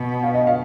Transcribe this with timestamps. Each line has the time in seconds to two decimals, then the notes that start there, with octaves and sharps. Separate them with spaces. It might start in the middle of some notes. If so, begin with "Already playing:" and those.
Already playing: B2
0.23 F5
0.34 D#5
0.47 F5